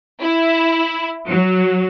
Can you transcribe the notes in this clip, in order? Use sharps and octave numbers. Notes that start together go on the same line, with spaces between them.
E4
F#3